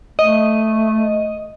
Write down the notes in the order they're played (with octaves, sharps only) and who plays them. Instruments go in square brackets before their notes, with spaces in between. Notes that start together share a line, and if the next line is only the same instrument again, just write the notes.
[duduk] A3 [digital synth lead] D#5